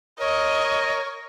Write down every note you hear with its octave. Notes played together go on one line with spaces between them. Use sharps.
A#4 C#5 D#5